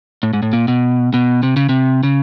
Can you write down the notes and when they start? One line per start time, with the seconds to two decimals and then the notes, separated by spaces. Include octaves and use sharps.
0.23 A2
0.33 G#2
0.43 A2
0.53 A#2
0.68 B2
1.14 B2
1.43 C3
1.56 C#3
1.69 C3
2.03 C#3